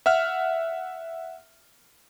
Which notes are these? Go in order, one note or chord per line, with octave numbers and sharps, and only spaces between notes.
E5 F#5 F6